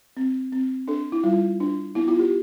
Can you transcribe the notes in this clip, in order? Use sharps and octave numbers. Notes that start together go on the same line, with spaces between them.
C4
C4
D4 A4
E4
G3 F4
D4
B3 E4
F4
G4